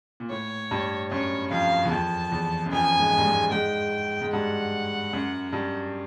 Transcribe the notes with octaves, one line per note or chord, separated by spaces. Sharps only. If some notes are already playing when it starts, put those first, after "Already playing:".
A#2
A2 C#5
G2
F#2 C#5
F2 F5
E2
F2 A5
E2
F#2
F2 G#5
G#2
G2
G#2
G#2 G5
G#2
G2 F#5
F#2
G2